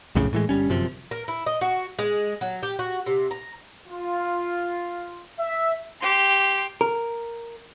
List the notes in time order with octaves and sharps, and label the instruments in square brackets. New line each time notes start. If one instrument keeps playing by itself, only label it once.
[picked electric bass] B1 F2 A2 C#3
A2 E3 G#3
G1 G3 C#4
G1 F#2 C3 F3
[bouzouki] A#4
E4
D#5
F#4
G#3
F#3
G4
F#4
C3
A#5
[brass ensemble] F4
E5
[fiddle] G4 C6
[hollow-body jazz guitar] A#4